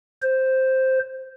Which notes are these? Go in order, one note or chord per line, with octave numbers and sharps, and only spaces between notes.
C5